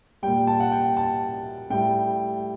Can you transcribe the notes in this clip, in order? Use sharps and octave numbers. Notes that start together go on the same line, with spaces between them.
A#2 G3 G5
A5
F#5
G5
A5
A2 G3 G5